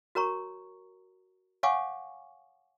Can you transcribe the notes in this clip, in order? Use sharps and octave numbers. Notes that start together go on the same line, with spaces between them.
F#4 A#4 C#5 A#5 C#6
C#5 F5 F#5 G#5 C#6 D6